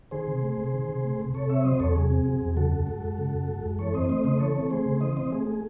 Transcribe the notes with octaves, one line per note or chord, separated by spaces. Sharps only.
D#3 G#4 C5
C3
A3
C3
D#3
C3
A3
C3
C3 A4 C#5
C4 C#5 E5
F#3 C5 D#5
E2 A4 C#5
C3 G#4
C4
F#3
E2
C#3 F#4 A4
F#2
G#3
F#2
C#3
F#2
G#3
F#2
E3 A4 C#5
C4 C5 D#5
A3 C5 D#5
C#3 C5 D#5
E3 A4 C#5
C4
A3 G#4 C5
C#3
E3 C5 D#5
C4 C5 D#5
A3 G#4
G#4